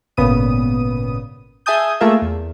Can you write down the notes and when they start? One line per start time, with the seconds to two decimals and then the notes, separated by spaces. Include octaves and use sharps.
0.17 G#1 A#2 C#3 B3 D#6 D#7
1.66 G#4 E5 G#5 A5 D#6 G6
2.01 A3 A#3 F4 G#4 A#4 E5
2.22 E2